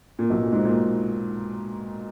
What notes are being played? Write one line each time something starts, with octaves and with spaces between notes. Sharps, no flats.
A#2
B1 B2
A#2
G#2
A#2